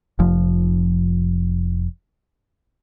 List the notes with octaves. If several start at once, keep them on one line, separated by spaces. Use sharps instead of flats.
F1 F3